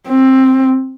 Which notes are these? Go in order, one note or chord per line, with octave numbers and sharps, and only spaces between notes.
C4